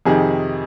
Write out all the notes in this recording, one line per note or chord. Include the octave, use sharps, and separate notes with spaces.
F2 C3 D#3 G#4